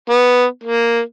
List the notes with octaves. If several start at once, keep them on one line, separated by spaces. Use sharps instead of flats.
B3
A#3